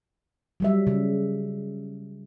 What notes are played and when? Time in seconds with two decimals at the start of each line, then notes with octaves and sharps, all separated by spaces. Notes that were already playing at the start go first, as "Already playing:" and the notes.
0.60 F#3 G3 E5
0.87 C#3